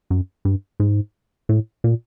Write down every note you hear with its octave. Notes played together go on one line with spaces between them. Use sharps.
F#2
G2
G#2
A2
A#2